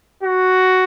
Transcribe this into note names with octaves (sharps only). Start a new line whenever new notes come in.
F#4